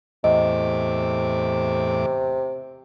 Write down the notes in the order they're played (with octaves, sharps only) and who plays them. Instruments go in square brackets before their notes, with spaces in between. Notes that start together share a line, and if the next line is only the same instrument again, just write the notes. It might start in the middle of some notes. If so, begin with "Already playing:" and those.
[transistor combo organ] E2 A2 D6 [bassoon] C3 [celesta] D#5